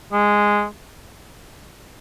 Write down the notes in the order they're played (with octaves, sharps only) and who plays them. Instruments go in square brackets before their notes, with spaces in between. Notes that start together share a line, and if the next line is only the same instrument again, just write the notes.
[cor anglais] G#3